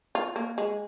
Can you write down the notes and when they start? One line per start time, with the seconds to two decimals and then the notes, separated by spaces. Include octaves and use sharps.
0.15 F4
0.36 A#3
0.58 G#3